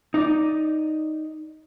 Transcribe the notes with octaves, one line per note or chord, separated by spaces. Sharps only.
D#4 D5